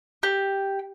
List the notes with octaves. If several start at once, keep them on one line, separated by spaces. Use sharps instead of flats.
G4